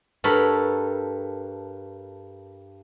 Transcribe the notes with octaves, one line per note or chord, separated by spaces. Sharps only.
G2 A4 A#4 C#5 B5